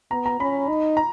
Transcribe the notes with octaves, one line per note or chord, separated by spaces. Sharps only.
B3 A#5
A#5
C#4 B5
D#4
A#5